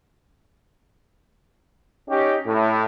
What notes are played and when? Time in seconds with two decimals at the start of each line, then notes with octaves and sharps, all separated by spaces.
2.09 C#4 D#4 G4
2.46 A2